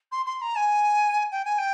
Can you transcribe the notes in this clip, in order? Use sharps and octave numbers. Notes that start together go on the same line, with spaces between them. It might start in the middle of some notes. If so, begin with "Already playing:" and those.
C6
C6
A#5
G#5
G5
G#5
G5